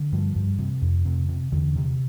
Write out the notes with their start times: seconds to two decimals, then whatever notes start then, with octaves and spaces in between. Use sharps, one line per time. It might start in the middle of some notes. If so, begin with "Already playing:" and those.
Already playing: D3
0.12 G2 F3
0.35 G2
0.59 C3
0.82 F2
1.05 C3
1.29 C3
1.52 E2 D3
1.76 C3